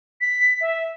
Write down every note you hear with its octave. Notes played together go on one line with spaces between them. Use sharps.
B6
E5